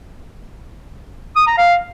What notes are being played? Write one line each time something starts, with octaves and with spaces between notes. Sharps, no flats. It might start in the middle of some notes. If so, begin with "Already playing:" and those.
D#6
A#5
F5